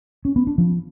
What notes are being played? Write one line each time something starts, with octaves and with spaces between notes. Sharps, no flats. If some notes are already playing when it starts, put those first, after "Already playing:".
C#4
B3
D4
F3